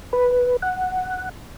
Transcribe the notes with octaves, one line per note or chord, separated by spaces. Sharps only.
B4
F#5